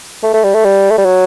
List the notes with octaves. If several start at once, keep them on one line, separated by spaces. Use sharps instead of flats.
A3
A3
G3
A3
G3
A3
G3
F#3